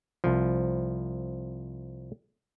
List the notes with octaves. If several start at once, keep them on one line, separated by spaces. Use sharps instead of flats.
C2 F3